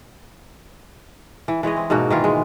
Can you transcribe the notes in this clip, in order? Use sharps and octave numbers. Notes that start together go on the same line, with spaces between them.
E3
E3 G#3 C#5 D#5
C4
G#2 B2 A#3 F#4
D#3 E3 F4
G#3